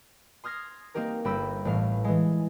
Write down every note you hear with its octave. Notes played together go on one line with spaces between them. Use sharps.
C6 D#6 F6 G#6 A#6 C7
A#3 C4 D#4 G4 A#4
G1 G4 B5 E6 A#6 D#7
A1 A2 F5
E3 G#3